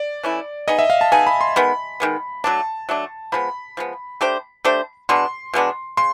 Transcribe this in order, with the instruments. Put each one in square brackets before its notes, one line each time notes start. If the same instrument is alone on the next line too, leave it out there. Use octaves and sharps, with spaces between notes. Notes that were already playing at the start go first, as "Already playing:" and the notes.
Already playing: [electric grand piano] D5
[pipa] E3 A3 C#4 E4
[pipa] B3 D#4 G#4 [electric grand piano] D#5
[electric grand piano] E5
F5
A5
[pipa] B3 D#4 G#4 [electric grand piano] G#5
[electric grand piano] B5
C6
[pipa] D#3 G#3 B3 [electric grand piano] B5
[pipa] D#3 G#3 B3
[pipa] F#3 A3 D4 [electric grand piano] A5
[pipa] F#3 A3 D4
[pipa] F3 G#3 B3 [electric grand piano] B5
[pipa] F3 G#3 B3
A3 D4 G4 C5
A3 D4 G4 C5
[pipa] B2 G#3 B3 D4 [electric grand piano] C6
[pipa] B2 G#3 B3 D4
[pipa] C#3 [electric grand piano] C6